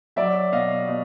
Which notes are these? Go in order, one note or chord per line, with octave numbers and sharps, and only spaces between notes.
F#3 D5 E5
B2 D#5 F5
B2